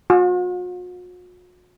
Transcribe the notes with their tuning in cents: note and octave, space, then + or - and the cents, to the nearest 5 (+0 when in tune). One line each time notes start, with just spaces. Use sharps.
F#4 -45